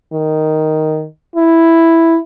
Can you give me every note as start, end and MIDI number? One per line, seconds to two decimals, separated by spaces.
0.12 1.05 51
1.36 2.17 64